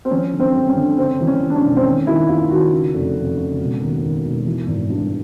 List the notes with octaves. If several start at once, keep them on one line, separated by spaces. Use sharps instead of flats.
C4
F3 C#4
D3
C4
G2
C#4
D3
C#3 C4
E3
C#4
E3
D4
C#4
E1
C4
D#3 C#4
D#3 E4
D#2 F4
D#3 F#4
C#3
F1
F1
C#3
E1
D#2
D#2
E1
E3
G#1
G2